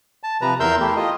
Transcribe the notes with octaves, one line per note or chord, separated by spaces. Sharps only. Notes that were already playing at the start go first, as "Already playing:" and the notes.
A5
C3 F3 B4 A#5
E2 A#4 E5 C6 E6 G6
A3 E4 G4
F4 D#5